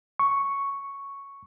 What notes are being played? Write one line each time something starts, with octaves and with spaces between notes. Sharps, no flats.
C#6